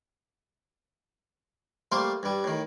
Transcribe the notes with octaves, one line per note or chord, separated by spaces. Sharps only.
G3 A3 A#3 C5 C6
G2 G3
A2 D#3